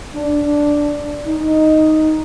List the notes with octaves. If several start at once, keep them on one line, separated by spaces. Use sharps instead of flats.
D4
D#4